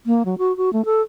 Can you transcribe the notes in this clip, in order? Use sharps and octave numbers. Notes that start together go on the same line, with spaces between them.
A#3
F#3
F#4
F#4
A3
A4